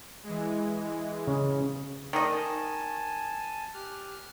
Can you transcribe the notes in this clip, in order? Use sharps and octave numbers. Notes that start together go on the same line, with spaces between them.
E3 G#3
C#3
D#3 A3 D5 D#5 D6
G#5 A5
G4 F6 F#6